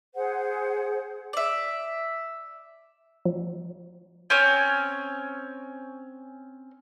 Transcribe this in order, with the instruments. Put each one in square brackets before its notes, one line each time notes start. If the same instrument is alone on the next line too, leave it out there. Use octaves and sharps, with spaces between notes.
[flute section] G#4 C5 F#5
[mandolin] D5 E5
[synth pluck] F3
[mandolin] C4 C#4 C#5